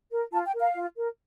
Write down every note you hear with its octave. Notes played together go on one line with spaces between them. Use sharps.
A#4
F4 A5
G5
A#4
F5
F4
A#4